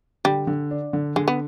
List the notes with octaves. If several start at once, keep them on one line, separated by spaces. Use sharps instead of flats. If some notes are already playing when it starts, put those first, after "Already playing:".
D3 G3
D3
D4
D3
D3 G#3
B3